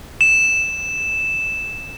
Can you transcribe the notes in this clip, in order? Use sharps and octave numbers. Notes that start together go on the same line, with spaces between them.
E7